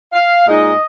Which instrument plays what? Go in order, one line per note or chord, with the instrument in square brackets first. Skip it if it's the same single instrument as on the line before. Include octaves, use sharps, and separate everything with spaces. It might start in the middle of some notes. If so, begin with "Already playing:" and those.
[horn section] F5
A#2 G#3 D#4 D#5